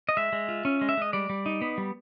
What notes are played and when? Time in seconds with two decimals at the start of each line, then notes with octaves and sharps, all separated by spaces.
0.09 D#5
0.17 G#3 E5
0.33 G#3
0.48 F4
0.65 C#4
0.81 G#3
0.89 E5
0.97 G#3 D#5
1.13 G3 D5
1.30 G3
1.46 D#4
1.61 B3
1.78 G3